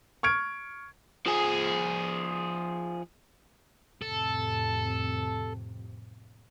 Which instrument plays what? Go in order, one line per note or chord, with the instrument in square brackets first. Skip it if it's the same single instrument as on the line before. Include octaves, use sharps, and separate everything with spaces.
[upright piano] C#6 F6 G#6 D7
[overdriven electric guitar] F3 G#4
[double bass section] F2 A2 C3 [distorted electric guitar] A4